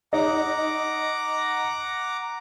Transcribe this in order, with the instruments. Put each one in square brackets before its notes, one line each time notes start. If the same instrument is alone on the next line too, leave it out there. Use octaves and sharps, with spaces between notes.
[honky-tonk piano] D#4 [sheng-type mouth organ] F#5 A#5 D6